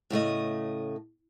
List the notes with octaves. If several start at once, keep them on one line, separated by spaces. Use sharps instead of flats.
A2 C#3 A3 D#5